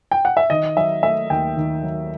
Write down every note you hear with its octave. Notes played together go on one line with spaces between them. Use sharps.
G5
F#5
E5
D#3 D#5
F#3 E5
A3 E5
D#2 G5
D#3
F#3